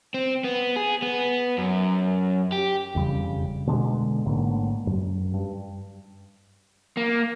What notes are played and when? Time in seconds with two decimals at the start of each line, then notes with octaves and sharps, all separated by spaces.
0.14 C4
0.44 B3
0.76 G#4
1.02 B3
1.58 F#2
2.52 G4
2.94 E1 F2 C#3 G3
3.67 B2 D3 G#3
4.25 A1 G#2 D3 A#3
4.87 F#2
5.34 G2
6.97 A#3